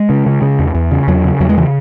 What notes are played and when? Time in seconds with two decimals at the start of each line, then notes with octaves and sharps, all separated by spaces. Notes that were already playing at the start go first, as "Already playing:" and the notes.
Already playing: G#3
0.10 C#3
0.26 C#3
0.42 C#3
0.59 E2
0.75 E2
0.91 C#3
1.08 E2 F#3
1.24 C#3
1.40 E2 F#3
1.49 G#3
1.57 C#3 E3